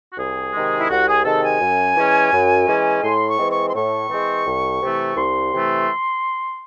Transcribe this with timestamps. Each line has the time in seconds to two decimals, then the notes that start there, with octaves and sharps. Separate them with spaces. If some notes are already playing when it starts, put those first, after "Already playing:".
0.12 F#4
0.17 C2 G#4
0.54 C3 D#3 G#3
0.76 E4
0.89 C2 F#4
1.07 G#4
1.25 C3 D#3 G#3 A4
1.43 G#5
1.60 F#2
1.96 E3 G#3 C#4
2.32 F#2
2.68 E3 G#3 C#4
3.03 A2 C6
3.27 C#6
3.39 E3 G#3 C4
3.51 C#6
3.68 C6
3.75 A2 C#6
4.09 E3 G#3 C4
4.46 C2
4.82 C3 E3 A3
5.17 C2 C6
5.53 C3 E3 A3